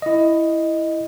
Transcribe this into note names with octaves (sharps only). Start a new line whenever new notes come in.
E4 D#5